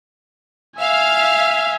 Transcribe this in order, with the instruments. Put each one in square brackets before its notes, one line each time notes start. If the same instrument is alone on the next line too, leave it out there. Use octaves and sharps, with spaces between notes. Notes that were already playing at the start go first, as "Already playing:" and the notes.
[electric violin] E5 G#5 [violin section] F5